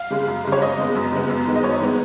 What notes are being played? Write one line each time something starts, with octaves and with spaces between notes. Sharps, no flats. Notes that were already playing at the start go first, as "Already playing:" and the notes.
Already playing: F5
C#3 G#3
F#2
C#3 G#3
C#5
F#2 D#5
C#3 G#3 B3
F#2
C#3 G#3 B3
F#2
D#3 G#3 B3
D#5
F#2 C#5
D#3 G#3 B3